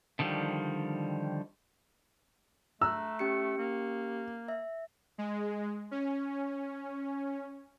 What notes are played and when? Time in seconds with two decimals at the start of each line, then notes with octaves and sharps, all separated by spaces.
0.19 D3 D#3 F3 G3
2.81 A3 A#5 E6 F#6
3.19 C#4 G4 C#7
3.58 A#3
4.48 E5
5.18 G#3
5.91 C#4